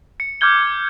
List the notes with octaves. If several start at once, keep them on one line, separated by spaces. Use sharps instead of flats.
C#7
D6 F6 G6 G#6 G7